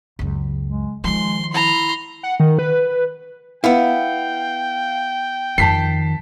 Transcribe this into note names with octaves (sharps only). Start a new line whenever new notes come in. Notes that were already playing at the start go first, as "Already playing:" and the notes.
C#2 F#2
G#3
D#3 F3 G#3 C6
E4 A#5 C6
F#5
D#3
B4
B3 E4 F5 G5
F2 D#3 A5 B6 C7